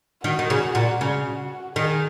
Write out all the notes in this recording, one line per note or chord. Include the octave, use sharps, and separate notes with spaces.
D#3 F#4
D#3
C#3
A#2
C#3 F#4
D#3 G#4